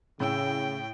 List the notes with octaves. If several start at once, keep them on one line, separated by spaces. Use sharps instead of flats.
A2 C#3 G5 E6